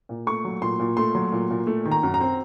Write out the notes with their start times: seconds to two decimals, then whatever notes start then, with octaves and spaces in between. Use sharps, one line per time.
0.09 A#2
0.27 A3 C#6
0.44 F#3
0.62 A#2 C6
0.80 A#2
0.97 A3 C6
1.15 F#3
1.32 A#2
1.50 A#2
1.67 A3
1.85 D#3
1.91 A#5
2.03 F#2
2.14 A#5
2.21 C4